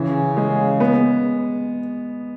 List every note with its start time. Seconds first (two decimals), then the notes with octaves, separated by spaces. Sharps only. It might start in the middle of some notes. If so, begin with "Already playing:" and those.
Already playing: C#3 E3
0.37 G#3
0.80 B3